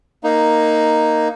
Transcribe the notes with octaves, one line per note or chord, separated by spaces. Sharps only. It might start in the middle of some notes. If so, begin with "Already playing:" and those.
A#3 D#4